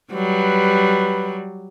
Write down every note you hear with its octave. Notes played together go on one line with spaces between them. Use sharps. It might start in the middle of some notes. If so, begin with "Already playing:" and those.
F#3 G3 B4